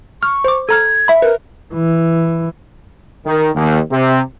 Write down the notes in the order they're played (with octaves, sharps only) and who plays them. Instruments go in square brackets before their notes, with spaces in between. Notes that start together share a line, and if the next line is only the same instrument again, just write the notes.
[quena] C#6 [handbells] F6
[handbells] C5 D6
[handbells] A4 A#5 F6 [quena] G#6
[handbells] E5 B5
[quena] A#4 [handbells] B4
[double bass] E3
[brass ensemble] D#3
D#2
C3